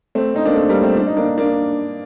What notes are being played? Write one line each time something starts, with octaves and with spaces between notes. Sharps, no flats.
A3 C4
C4 D#4
A#3 D4
A3 C4
G3 A#3
A3 C4
D4
D#4
A#3 D4
A#3 D4